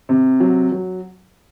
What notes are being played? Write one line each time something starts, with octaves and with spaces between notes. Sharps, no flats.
C3
F#3
F#3